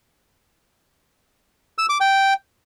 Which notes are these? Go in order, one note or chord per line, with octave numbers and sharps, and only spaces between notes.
E6
D6
G5